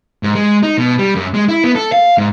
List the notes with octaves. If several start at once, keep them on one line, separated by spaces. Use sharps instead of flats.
G#2
G#3
D#4
B2
G3
F#2
G#3
E4
B3
A4
F5
G#2